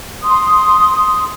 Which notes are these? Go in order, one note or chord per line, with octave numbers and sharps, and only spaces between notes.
C6 D#6